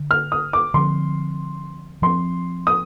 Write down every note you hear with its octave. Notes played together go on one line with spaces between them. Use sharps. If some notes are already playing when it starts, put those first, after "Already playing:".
Already playing: D3
F6
D#6
D6
D3 F3 C4 C6
F3 C4 C6
D#6